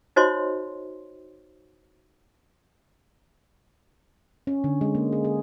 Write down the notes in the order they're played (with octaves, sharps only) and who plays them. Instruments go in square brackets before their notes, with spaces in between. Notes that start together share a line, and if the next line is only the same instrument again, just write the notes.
[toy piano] D#4 F#4 C5 C#5 D#5 C6
[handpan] C#4
D3
G#3
A#3
G#4
G#4